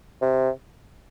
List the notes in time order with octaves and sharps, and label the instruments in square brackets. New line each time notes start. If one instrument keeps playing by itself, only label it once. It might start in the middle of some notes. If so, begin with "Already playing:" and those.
[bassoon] C3